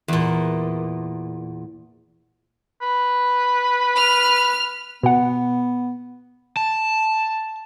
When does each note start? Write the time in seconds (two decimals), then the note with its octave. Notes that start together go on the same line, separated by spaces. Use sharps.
0.08 E2 A#2
2.82 B4
3.96 F6
5.03 B2 B3 F#5
6.57 A5